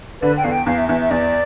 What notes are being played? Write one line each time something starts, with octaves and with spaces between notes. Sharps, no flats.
D3 B4
G5
E2 F5
G5
E2 F5
E5
E2 E5
E5
E2 D5